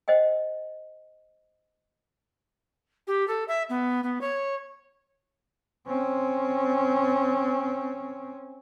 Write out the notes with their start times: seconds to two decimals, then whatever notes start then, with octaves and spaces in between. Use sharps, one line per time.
0.08 C5 D#5 F#5 G5
3.07 G4
3.27 A4
3.48 E5
3.69 B3
4.03 B3
4.21 C#5
5.87 C4 C#4